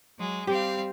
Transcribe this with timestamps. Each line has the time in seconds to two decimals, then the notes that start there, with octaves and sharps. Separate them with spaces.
0.17 F#3 G#3
0.47 G3 C4 G4 F5